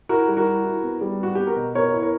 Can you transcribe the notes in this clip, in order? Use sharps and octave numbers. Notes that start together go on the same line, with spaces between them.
E4 F#4 A#4
G3
F#4 A#4
E4
E4
B3
G3
B3 F#4
B3 G4
F#4 A#4
B2
B3 A#4 C#5
E4
A#4 C#5